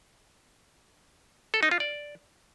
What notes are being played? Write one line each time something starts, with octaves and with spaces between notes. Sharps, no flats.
A4
D#4
F4
D5